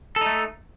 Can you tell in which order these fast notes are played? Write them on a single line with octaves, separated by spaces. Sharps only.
A4 D#4 A3